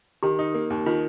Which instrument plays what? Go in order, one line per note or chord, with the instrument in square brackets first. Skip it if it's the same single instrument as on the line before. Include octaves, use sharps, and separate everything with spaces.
[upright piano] D#3 [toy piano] G4
[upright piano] D#4
A#3
D#2
[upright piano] D#3 [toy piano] F4